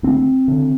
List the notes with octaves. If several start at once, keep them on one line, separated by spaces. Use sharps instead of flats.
D2 C4
D3